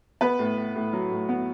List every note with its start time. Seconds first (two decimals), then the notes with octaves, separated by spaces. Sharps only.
0.21 B3 B4
0.39 A2
0.57 A2
0.75 A2
0.93 F#3
1.11 A2
1.29 B3